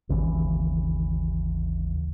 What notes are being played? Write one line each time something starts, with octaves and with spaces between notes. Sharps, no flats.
G#1 D#2 C#3 E3